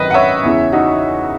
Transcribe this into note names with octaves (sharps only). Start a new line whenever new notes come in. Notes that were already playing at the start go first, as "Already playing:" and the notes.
Already playing: G#1 F#2 D#3 F#3 B4 D#5
F#5
C#5 E5
E2 C#3 E3
D#4 F#4